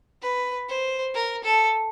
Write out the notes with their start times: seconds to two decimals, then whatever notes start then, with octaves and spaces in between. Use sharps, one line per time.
0.22 B4
0.69 C5
1.14 A#4
1.44 A4